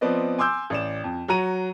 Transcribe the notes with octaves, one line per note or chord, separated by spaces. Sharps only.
F3 B3 C4 B4 D5 D#5
G#5 C6 D6 E6 G6
A1 D5 E7
F2
F#3 F#4 A#5 D#7